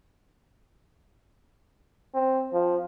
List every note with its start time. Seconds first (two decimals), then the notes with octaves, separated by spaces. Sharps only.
2.14 C4
2.53 F3